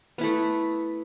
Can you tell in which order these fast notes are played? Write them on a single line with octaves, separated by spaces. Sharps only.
B3 E4 A3